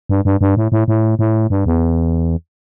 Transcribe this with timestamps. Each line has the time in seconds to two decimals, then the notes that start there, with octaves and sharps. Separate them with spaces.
0.09 G2
0.25 G2
0.41 G2
0.57 A2
0.72 A2
0.88 A2
1.19 A2
1.50 G2
1.66 E2